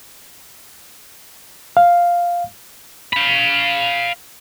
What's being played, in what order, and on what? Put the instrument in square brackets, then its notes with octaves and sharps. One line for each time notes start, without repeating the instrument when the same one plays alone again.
[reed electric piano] F5
[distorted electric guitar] F5 B5